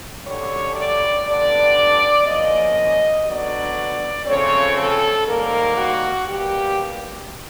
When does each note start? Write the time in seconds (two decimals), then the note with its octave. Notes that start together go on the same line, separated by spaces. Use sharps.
0.25 F#2 D3 G3 C#5
0.76 D5
1.25 D3 G3 B3 D4 D5
2.26 C#3 F3 A#3 C#4 D#5
3.26 D3 F#3 B3 D5
4.27 C#3 F3 A3 C4 C#5
4.77 A4
5.27 G#2 D#3 G3 A#3 A#4
5.77 F#4
6.27 B2 G3 A#3 G4